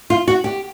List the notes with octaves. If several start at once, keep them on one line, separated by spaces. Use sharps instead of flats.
F4
F#4
G4